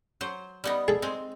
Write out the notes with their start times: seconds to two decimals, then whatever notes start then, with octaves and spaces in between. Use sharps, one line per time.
0.21 F#3 C5
0.64 G3 B3 D#4
0.88 G#4 A4
1.02 G#3 C4